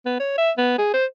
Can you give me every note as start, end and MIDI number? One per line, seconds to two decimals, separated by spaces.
0.06 0.19 59
0.20 0.35 73
0.38 0.51 76
0.58 0.76 59
0.78 0.91 68
0.93 1.05 72